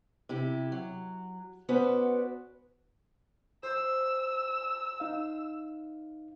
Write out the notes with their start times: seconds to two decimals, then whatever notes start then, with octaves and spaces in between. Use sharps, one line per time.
0.29 C3 E4 G4
0.72 F#3
1.69 B3 C#4 F#4 B4 C5 D5
3.63 C5 E6
5.00 D#4 F5